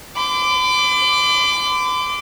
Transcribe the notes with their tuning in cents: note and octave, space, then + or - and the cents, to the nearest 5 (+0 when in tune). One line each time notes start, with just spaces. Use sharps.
B5 +45 D6 +0